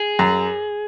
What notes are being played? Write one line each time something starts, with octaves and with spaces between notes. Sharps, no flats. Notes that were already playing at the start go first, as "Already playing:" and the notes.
Already playing: G#4
F#2